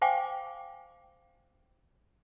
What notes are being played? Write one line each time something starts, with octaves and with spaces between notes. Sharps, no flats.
C5 F5 G5 G#5 C#6 D6